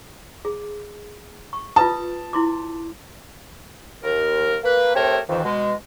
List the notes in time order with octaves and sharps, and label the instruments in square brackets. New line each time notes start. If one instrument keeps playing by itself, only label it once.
[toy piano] G#4
C#6
[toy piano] F4 B4 D#6 [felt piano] A5
[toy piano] E4 C6 D6
[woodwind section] D#2 A#4
A#3 B4
A3 C4 G4 A#4 C#5 E5
F2 D#3 E3
B2 G#3